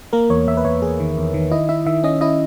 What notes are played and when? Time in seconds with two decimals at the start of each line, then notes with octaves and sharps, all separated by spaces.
0.13 A#3 A#4
0.30 E2 C#5
0.47 E2 E5
0.57 B4
0.65 E2 C#5
0.82 E2 G#4
1.00 D#3
1.18 E2
1.34 D#3
1.51 E4 D#5
1.69 E4 E5
1.86 D#3 E5
2.04 C#4 D#5
2.21 E4 D#5